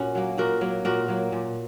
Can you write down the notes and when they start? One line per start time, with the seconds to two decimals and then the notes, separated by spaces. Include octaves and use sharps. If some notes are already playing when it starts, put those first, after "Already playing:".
Already playing: A#2 C#4 F#4
0.15 F#3 A#3
0.38 A#2 F#4 A#4
0.61 F#3 A#3
0.85 A#2 F#4 A#4
1.08 F#3 A#3
1.32 A#2